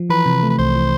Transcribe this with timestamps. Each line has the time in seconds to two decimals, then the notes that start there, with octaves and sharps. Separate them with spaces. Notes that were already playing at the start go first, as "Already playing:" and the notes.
Already playing: F3
0.10 E3 B4
0.26 C3
0.43 A3
0.50 B4
0.59 C2 C5
0.76 E3